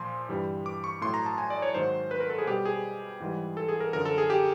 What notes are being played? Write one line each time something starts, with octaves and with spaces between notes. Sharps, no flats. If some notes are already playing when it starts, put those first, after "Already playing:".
Already playing: A#2 F3 C6
G2 E3 G3
D6
C#6
A2 F#3 C6
A#5
A5
G#5
D5
C#5
G#2 D#3 F#3 C5
B4
A#4
A4
G#4
B2 G3 G4
G#4
G#2 E3 G3
A4
G#4
A#4
F#2 D3 F3 A#4
A4
G#4
G4